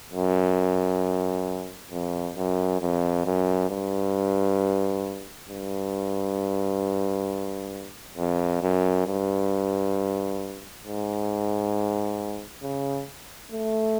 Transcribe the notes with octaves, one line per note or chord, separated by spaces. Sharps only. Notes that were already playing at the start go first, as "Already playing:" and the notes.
F#2
F2
F#2
F2
F#2
G2
G2
F2
F#2
G2
G#2
C#3
A3